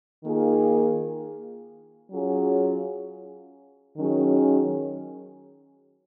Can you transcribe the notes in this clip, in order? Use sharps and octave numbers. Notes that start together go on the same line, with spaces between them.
D#3 A#3 F4 G#4
F#3 C#4 F4 G#4
D#3 F#3 C#4 G#4